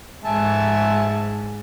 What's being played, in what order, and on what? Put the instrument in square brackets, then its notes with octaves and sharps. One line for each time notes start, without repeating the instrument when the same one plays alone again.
[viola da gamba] G#2 [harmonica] E5 G#5 A5